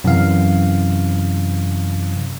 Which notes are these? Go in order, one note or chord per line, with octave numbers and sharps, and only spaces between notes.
F#2 C3 E3 F5